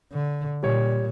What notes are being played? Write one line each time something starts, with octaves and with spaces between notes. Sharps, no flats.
D3
A#2 G3 C#5